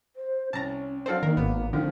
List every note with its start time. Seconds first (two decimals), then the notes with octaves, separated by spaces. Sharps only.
0.16 C5
0.53 C2 C#4 A5 A#5
1.06 F#3 C4 D4 A4 C5 F5
1.23 D#3 A#3 A#4
1.37 G#1 B3
1.73 D3 D#3 F3 A3 C4